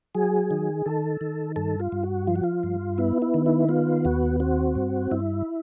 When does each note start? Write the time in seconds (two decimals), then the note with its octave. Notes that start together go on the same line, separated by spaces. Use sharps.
0.15 F#3 G#4
0.51 D#3
0.86 D#3 A4
1.21 D#3
1.56 G2 A4
1.80 F4
1.92 G2
2.03 F#4
2.27 F3 F4
2.36 F#4
2.44 F4
2.63 G2
2.98 B3 E4
3.22 E4
3.34 D#3
3.46 E4
3.69 B3 F4
4.05 D#2 F#4
4.40 C4 F#4
4.75 G2
5.11 G2 E4